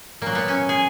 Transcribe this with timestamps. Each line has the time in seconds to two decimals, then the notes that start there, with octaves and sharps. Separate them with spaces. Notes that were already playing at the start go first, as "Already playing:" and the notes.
0.22 A#2 F#3 A#3
0.35 B3
0.48 C#4
0.69 G#4